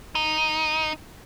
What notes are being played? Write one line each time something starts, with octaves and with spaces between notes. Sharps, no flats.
D#4